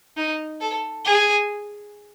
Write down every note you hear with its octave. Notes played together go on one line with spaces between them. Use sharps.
D#4
A4
G#4